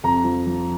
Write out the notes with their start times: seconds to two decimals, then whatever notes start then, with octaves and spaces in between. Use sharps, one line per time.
0.04 F2 A#5
0.24 F3
0.46 F3